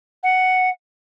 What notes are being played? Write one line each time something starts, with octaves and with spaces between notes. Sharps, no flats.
F#5